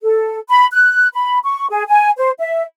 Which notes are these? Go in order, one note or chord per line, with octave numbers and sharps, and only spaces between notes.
A4
B5
F#6
B5
C#6
G#4
G#5
C5
E5